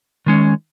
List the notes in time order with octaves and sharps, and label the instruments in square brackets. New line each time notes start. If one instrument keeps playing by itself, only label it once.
[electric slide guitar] D#3 G#3 C#4